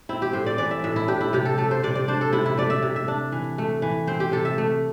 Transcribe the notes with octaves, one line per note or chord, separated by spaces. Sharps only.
C4 E4
G4
A2 C5
D5
E3 D5
E5
A2 E5
E4
D4 G4
E4
C3 G4
A4
A3 A4
C5
C3 D5
D5
D4 C5
A4
C3 E4
E4
A3 D5
E5
C3
E5
D4
E3
A3
E3
C4 C5
G4
C3 A4
E5
A3